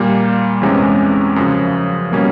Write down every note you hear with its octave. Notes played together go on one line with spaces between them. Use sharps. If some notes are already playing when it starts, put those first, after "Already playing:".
Already playing: A#2 G3 A#3
E2 C3 E3 G#3 C#4
F#2 C#3 F3
B2 G3 A#3 C#4